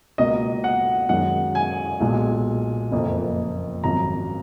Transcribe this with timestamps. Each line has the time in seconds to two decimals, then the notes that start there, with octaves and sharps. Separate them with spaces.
0.18 C#2 B2 A#3 D#5
0.64 F#5
1.09 F#2 D#3 G#3 F#5
1.55 G#5
2.00 B1 A#2 G#3
2.92 F#1 F2 F3 A#3
3.84 G#1 F#2 F3 A#5